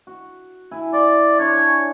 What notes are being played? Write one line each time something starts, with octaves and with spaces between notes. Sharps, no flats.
F#4
E4 G#5
D5 C6
D4 C#5 C6
G#5